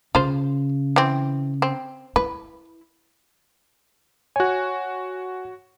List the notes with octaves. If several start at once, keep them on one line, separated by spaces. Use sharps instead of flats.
C#3 F4 C5
E3 C4
C4
E4 B4
F#4 C#5 G#5 F#6